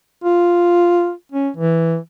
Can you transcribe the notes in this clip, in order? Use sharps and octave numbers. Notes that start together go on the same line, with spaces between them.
F4
C#4
E3